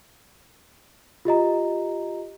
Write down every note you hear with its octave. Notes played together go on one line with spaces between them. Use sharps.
F4 G4 D#5 A#5